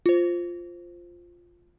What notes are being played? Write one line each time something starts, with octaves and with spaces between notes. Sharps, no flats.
F4 C5